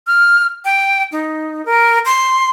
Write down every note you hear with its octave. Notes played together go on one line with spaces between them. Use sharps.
F6
G5
D#4
A#4
C6